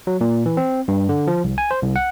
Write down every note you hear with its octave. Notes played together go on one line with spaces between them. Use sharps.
F#3
A#2
E3
C4
G2
D3
F3
C2
G#5
C5
C2
F#5